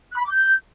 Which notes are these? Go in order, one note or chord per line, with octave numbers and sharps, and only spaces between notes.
F#6
B5
D6
G6